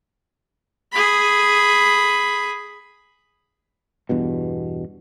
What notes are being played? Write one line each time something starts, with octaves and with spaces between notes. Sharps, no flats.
G#4 B5
E2 G2 B2